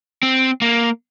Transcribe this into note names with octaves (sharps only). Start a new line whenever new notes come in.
C4
A#3